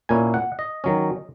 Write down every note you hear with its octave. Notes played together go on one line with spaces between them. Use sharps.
A#2 A#3 C#4 E4 G#5
F#5
D#5
D#3 F#3 C#4